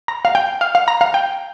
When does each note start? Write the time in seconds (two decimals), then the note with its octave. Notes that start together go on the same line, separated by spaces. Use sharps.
0.08 A#5
0.25 F5
0.35 G5
0.61 F5
0.75 F5
0.88 A#5
1.01 F5
1.14 G5